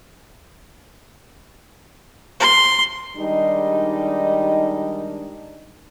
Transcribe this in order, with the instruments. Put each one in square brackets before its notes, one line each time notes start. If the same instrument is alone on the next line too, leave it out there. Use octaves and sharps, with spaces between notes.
[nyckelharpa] C6
[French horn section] D#3 G3 G#3 D4 D#4